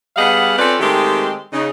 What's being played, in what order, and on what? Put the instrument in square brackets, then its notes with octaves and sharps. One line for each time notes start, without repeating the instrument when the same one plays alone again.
[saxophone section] G3 B3 G#4 D#5 F5 F#5
C4 C#4 F4 A4 B4 D5
D#3 G#3 A3 C4 G4
C#3 D#4